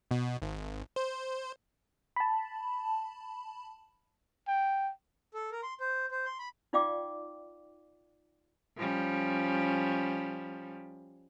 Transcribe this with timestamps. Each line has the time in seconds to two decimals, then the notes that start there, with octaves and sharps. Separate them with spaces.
0.11 B2
0.42 G#1
0.96 C5
2.16 A5 B5
4.48 G5
5.34 A4
5.52 A#4
5.63 C6
5.80 C5
6.11 C5
6.25 C6
6.39 B5
6.73 D#4 F4 D5 F5 G5 D6
8.77 F3 G3 C#4